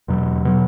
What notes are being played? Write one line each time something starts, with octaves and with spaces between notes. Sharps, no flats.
E2 B2 F#3
B2 F#3